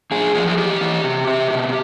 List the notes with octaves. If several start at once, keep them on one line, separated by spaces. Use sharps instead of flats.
A#2 G#4
F3 G#4
G#4
E3 G4
E3
C3
C3
B2